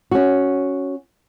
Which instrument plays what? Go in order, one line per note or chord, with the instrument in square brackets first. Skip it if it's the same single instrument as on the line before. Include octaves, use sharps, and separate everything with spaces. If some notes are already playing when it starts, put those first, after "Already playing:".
[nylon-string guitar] C#4 F#4